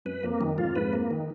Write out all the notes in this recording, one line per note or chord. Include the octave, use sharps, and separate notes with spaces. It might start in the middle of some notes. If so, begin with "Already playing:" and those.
F#2 B4
F2 A#3
F#2 D#3
F2 G#2 F4
F2 G#2 B4
A#3
D#3